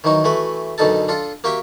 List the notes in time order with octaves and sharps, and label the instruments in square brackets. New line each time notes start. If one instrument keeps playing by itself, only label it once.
[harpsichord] D#3 E3 F#3 D#4 F#4
E3 A3 F#4 B4
F#2 B2 D3 D#4 A4 A5
D4 F4 A4
A#3 F#4 G4 E5 G5